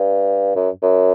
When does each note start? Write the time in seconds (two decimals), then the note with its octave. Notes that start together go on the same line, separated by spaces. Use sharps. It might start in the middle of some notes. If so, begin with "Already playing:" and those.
Already playing: G2
0.55 F#2
0.82 F#2